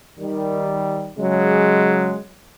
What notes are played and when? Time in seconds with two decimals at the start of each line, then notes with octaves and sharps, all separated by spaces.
0.20 D#3 G3
1.18 C#3 F#3 G#3